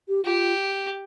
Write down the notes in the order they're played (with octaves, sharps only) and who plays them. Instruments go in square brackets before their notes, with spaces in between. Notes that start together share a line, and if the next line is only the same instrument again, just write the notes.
[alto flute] G4
[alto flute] F4 [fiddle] G4